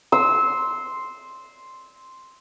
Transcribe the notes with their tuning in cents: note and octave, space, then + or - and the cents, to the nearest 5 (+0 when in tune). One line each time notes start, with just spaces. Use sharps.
C6 +0 E6 -20